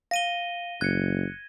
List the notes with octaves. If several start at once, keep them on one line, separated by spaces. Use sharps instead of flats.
F5 A#6 D#7 G7
F#1 F#6 G#6 C#7